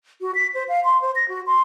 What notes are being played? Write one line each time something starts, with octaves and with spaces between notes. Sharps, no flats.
F#4
B6
C5
F5
C6
C5
A#6
F#4
C6